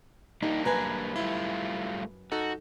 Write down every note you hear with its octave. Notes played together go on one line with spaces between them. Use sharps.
G3 A#3 D4 D#4 G4
F#2 B4 G#5 A#5
G3 A3 E4 F4
D#4 F#4 A4